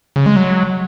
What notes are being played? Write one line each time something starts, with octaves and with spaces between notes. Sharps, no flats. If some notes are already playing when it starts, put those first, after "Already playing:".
C#3
G#3
F#3